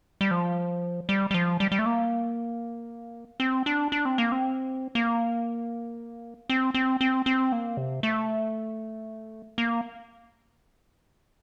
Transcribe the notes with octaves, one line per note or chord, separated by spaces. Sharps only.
G3
F3
G3
G3
F3
G3
G3
A3
A#3
C4
D4
D4
C4
A#3
C4
A#3
C4
C4
C4
C4
A#3
C3
A3
A#3